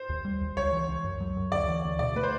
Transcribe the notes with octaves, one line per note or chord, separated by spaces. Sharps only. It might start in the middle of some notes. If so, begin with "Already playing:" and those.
Already playing: C5
D#2
G3
D#2
C#2 C#5
E3
C#2
F#2
F#3
F#2
D2 D5
E3
D2
B2 D5
A3 B4
C5